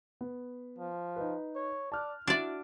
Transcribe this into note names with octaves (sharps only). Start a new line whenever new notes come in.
B3
F3
D#4 B4
C#5
D5 A5 F6 F#6
D4 E4 F#4 D5 E5